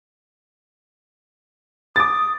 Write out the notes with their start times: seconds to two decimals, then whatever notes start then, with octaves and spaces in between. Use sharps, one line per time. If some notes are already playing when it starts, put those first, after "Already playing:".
1.96 D6 D#6 A6